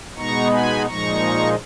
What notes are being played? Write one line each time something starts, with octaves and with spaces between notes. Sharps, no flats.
B2 G#3 B3 D#4 A#5 C#6
G#5 B5
A#2 F3 G#3 D#4 A#5 C#6